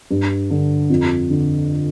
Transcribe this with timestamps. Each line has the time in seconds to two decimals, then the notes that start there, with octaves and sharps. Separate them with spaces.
0.11 G2
0.50 D3
0.90 F2
1.30 D3